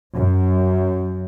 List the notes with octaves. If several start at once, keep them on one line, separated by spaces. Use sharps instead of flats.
F#2